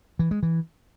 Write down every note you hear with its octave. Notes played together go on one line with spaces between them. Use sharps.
E3
G#3
E3